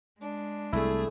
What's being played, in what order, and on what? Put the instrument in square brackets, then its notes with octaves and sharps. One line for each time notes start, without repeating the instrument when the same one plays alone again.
[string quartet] G#3 D4
[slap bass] C2 [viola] A3 G#4 [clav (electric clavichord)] E4